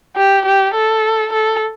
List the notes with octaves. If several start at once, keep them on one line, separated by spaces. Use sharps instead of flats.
G4
G4
A4
A4